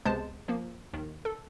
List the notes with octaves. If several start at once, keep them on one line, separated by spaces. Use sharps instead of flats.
C#2 C3 G#3 B3 C5 A5
F3 A#3
D#2 D#3
A4